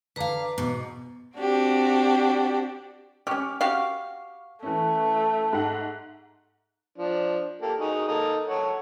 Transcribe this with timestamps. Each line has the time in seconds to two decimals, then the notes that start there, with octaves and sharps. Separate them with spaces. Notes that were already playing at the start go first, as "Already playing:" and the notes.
0.16 D3 B4 F5 A#5 D6
0.58 G#2 B2
1.36 C4 D4 F#4 G4
3.27 C#4 G4 C#6 D6 F6
3.61 F#4 G4 F5
4.63 E3 A3 C#4
5.53 G#2 F#5
6.98 F3 D4
7.61 A#3 G4 A4
7.80 D#4 F#4 G#4
8.08 A#3 D#4 A4
8.48 A4 C#5 F#5